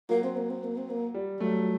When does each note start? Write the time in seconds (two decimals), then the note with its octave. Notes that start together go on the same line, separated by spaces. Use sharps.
0.09 F#3 A#3
0.24 C4
0.36 A#3
0.50 C4
0.64 A#3
0.77 C4
0.90 A#3
1.14 G3
1.40 F#3 A3